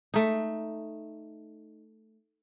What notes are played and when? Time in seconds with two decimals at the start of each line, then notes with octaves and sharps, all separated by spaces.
0.14 A3 D#4